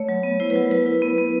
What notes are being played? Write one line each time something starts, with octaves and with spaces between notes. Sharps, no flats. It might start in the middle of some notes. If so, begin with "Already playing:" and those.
Already playing: A3 C#5
F#3
B3
E4 C5
B4
F#3 A#4
E4 B4
E4
B3
B3